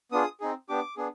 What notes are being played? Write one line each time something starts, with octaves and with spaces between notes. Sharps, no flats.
B3 D4 F4 G#4 D#6
C4 D#4 G#4
B3 D4 G4 D6
B3 D4 G#4